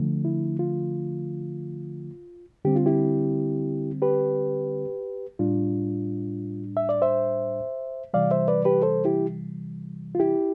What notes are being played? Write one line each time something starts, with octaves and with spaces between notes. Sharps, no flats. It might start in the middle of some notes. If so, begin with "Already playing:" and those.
Already playing: D3 F3 A3
E4
F4
D3 G3 C4 G4
F4
E4 G4
G4 B4
A2 G3 D4 F4
E5
D5
C5 E5
C3 E3 G3 D5 F5
C5 E5
B4 D5
G4 B4
A4 C5
E4 G4
F4
E4 G4